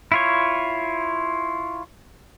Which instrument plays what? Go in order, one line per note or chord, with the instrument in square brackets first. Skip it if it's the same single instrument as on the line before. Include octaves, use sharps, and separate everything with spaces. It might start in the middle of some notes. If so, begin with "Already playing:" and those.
[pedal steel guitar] E4 F4 C#5